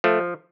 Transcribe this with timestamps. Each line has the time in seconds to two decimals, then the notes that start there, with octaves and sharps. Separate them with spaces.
0.04 F3 A3